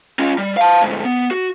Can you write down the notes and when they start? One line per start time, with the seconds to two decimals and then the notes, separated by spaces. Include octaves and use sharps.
0.19 C#4 F4
0.38 G3
0.57 F5 A5
0.82 D2 G#2
1.05 B3
1.31 F#4